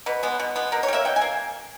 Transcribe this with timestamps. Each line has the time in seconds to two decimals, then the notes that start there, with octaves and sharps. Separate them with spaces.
0.06 B2 B4
0.23 G#3 B3
0.40 B2
0.56 G#3 B3
0.72 B2 A#4
0.83 C#5
0.88 G3
0.93 A#3 E5
1.05 B2 G5
1.16 G#5
1.22 A#3